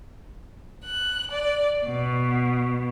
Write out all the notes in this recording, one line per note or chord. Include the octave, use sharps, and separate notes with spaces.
F#6
D5
B2